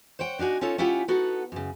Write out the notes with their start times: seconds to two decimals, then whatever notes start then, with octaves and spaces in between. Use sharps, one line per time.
0.19 C5 C#5 F#5 G5
0.39 D4 D#4 F#4 G#5
0.61 C#4 D#4 F4 A4 C#5
0.78 C#4 E4 F4 G4 F#5 G#5
1.08 B3 D#4 F#4 A4 F#5
1.52 F#2 C#3